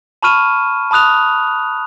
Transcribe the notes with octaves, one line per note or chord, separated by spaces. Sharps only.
A5 B5 C#6 F6 D#7 E7
A5 B5 D#6 F#6 F7